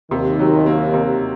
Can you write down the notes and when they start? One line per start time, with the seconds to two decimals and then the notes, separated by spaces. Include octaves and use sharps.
0.11 D#2 C3 D#3
0.39 F#3
0.66 A#3
0.94 C3